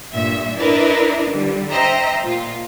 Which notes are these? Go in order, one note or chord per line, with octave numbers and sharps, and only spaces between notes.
G2 A#2 E5
D4 E4 A#4 B4 D#5 E5
D3 G3
C5 D#5 E5 G5 A#5
A#2 F4